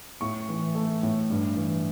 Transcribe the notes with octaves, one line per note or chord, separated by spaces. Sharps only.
A2 C#6
E3
A3
A2
G2
E3